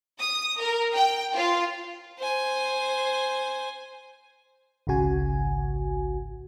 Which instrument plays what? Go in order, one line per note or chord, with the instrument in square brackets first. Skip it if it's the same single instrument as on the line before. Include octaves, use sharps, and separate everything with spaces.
[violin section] D#6
A#4
G5
F4
[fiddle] C5 G#5
[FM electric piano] G#1 C#2 C#3 F#4 G#5